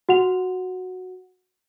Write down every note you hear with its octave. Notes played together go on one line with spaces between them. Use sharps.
F#4 F#5 F7